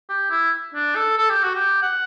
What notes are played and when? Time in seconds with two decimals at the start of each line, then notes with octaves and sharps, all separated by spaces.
0.10 G4
0.31 E4
0.75 D4
0.96 A4
1.18 A4
1.30 G4
1.43 F#4
1.55 G4
1.82 F#5